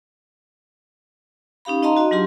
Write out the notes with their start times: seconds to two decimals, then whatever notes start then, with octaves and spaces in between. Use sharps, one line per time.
1.65 C#4 D#4 G4 F5 B5
1.82 D#4 D#5 F5 A5 A#5 C6
1.97 F#4 D#5
2.11 F#3 D4 F4 G4 C6